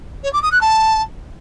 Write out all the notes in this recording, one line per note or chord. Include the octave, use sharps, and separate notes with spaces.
C#5
D6
D#6
F#6
A5